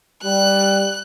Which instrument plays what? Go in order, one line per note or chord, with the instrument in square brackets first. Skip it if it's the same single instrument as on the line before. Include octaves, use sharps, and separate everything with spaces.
[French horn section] G3 [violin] F#6